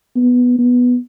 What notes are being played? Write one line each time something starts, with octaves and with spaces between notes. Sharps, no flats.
B3
B3